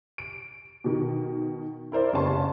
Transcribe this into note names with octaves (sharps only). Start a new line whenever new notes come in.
D7
B2 D#3
E4 A#4 C5 D5
F#1 C#3 B3 A5 C6 C#6